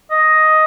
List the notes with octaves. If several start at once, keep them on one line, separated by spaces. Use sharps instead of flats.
D#5